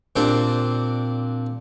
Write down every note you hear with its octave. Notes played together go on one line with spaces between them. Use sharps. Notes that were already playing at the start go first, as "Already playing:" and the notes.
A#2 C4 D4 G4